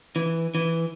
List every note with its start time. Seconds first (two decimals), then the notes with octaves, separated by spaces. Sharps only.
0.16 E3
0.55 E3